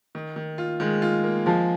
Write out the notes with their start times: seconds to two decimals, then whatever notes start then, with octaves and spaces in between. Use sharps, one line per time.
0.15 D#3
0.36 D#3
0.58 F4
0.80 D#3 G#3
1.02 F4
1.24 A#3
1.46 F3 G#3